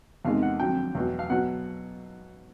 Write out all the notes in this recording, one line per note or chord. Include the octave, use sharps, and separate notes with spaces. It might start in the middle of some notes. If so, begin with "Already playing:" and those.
E2 C3 D#3 G#3 F5
F#5
F2 D3 F#3 G5
E2 B2 F#3
F5
B2 F#3 F#5